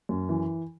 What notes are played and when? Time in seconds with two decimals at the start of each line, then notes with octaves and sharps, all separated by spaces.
0.09 F#2
0.29 E3